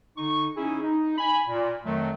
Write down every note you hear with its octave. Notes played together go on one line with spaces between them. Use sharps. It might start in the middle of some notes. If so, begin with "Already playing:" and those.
D3 D#4 C#6
C#4 D#4 E4 G#4
D#4
G#5 B5
A#2
F2 D#3 F#3 A3